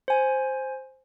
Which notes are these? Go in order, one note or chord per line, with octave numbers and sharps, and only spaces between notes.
C5 G#5